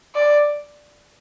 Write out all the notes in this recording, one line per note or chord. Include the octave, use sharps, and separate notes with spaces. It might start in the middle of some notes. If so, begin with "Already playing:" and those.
D5